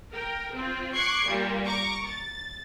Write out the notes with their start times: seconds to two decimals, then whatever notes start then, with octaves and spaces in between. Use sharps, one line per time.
0.12 A#4 G5
0.54 C4 F4
0.95 C#6 D6 F#6 G#6 C7 C#7
1.28 A#2 G3 A#3
1.66 A#5 C#6 D6
2.07 A6